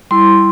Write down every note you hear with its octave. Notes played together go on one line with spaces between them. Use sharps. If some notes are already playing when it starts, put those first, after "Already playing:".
G3 E4 C6